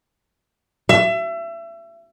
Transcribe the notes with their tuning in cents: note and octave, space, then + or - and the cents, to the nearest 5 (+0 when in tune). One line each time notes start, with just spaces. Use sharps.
E5 +30